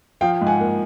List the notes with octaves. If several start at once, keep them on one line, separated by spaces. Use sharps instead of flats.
F3 F5 G5
G#2
F#5 G#5
A#3